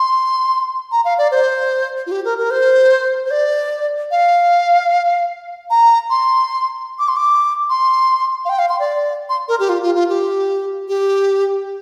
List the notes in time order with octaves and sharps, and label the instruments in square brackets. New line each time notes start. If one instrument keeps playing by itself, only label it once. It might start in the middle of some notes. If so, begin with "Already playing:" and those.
Already playing: [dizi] C6
A#5
F5
D5
C5
F4
G4
A#4
A#4
C5
C5
D5
F5
A#5
C6
D6
C6
D6
C6
F5
G5
F5
C6
D5
C6
A#4
G4
F4
F4
F4
G4
G4